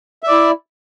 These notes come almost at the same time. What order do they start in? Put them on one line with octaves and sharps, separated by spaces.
E5 D5 E4